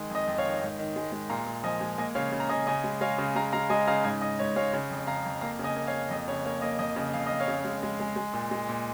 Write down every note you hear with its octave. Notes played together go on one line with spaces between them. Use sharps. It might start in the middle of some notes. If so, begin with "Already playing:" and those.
Already playing: D#3 G#3
F2
D#5
F2
C#5 F5
D#3
G#2
D#3
G#3
G#3
A#2 F5 A#5
A#2
F3 D#5 G#5
G#3
A#3 D#5 G#5
C#3 C#5 F5
C#3
A#5
C#3 D#5 G#5
C#3 D#5 G#5
G#3
G#3 C#5 F5
C#3
G#3 F5 A#5
G#3 F5 A#5
G#3 D#5 G#5
C#3 F5 A#5
G#2 D#5 G#5
G#2 D#5
G#2 C#5
G#3 C#5 F5
C#3
F2
C#3 F5 A#5
F2
A#3 F5 A#5
C#3
D#5 G#5
A#3
C#5 F5
A#3
F2 D#5
C#3 C#5
A#3 C#5
A#3 D#5
F2 D#5
C#3
F2 F5
F2 D#5
C#5 F5
C#3
G#3
G#3
G#3
G#3
A#2
G#3
A#2